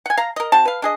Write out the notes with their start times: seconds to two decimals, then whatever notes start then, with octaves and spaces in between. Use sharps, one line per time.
0.06 F#5 G#5
0.17 F5 A#5
0.36 A#4 D#5
0.52 C4 F#4 A5
0.65 B4 F5
0.82 D4 G#4 D#5